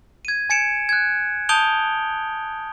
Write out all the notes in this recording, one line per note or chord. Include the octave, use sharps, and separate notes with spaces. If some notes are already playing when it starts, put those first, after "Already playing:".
G#6 D#7
G#5 G#6 C#7 D7 E7
F#6 G#6
A5 D#6 G6 D7 F7 G7